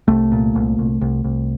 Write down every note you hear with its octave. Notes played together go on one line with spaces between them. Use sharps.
C2 A3
A#2
C2
C2
C2
C2